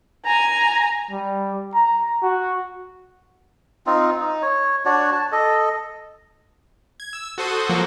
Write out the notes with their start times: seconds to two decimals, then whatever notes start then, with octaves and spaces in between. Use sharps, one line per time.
0.25 G#5 A#5
1.11 G3
1.75 A#5
2.23 F#4
3.86 C4 D#4 F4
4.20 D#4
4.42 C#5
4.85 D4 F#4 C#5 D5
5.13 A5
5.32 A4 D#5
7.00 G#6
7.13 E6
7.38 F#4 A4 C5 D#6
7.69 F3 F#3 A#3 F#4 A4 C5